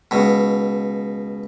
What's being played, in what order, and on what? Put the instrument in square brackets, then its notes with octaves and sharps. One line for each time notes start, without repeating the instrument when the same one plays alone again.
[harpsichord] C#2 B2